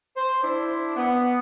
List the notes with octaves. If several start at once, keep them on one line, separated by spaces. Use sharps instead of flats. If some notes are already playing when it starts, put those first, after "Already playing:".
C5
D4 E4
B3